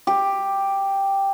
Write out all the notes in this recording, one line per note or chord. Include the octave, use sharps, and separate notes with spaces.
G4